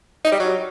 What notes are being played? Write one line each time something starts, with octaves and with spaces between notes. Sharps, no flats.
D#4
G3
F#3